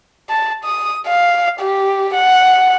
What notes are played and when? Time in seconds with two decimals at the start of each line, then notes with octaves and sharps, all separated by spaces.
0.30 A5
0.65 D#6
1.07 F5
1.60 G4
2.14 F#5